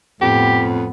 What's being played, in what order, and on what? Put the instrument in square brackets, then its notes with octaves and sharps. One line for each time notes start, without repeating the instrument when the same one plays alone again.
[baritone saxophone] F2 [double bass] A2 B3 [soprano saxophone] G4